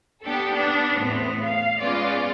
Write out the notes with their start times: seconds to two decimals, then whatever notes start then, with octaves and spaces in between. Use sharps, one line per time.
0.24 B3 D4 G4 A4
0.53 B3 D4
1.00 E2 A2 B3 C4
1.43 F5
1.80 G#3 B3 C#4 F4 D5